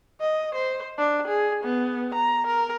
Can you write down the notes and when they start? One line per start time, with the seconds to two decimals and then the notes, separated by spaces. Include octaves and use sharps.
0.20 D#5
0.55 C5
0.98 D4
1.28 G#4
1.64 B3
2.15 A#5
2.47 A#4